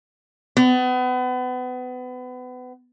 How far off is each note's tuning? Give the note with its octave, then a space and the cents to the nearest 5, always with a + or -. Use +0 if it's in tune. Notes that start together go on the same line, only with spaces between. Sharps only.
B3 +30